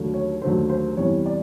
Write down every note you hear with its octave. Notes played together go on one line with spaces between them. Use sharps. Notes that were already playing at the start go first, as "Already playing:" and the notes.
Already playing: D#2 D3 F#3 A3
C#5
D#2 D3 F#3 A3 C5
C5
E2 C3 E3 G3 C#5
D5